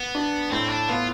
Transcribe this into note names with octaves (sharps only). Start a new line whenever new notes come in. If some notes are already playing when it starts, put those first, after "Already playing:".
Already playing: B3
D4
A2 C4
D4
B3 F4